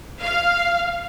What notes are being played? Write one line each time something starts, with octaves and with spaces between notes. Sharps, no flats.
F5